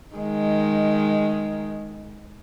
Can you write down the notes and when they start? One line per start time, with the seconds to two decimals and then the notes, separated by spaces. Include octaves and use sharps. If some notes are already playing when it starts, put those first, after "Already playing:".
0.15 D#3 G#3